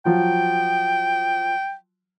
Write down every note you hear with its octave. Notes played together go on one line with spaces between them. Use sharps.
F3 F#3 G5